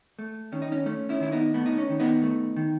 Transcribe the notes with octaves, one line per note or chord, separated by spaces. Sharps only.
A3
D#3 C#4
D#4
C#4
A3 C#4
C#4 E4
D#3 E4
B3 D#4
A3 B3
D#4
C#4
D#3
B3 D#4
A3
D#3